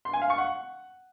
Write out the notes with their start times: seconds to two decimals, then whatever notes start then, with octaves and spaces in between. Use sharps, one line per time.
0.05 C6
0.13 G#5
0.22 F5
0.30 C#6
0.38 F#5